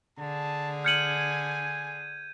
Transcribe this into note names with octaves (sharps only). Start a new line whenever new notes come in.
D3 G#4 A5
G#5 F6 G6 G#6 C#7 D#7 F#7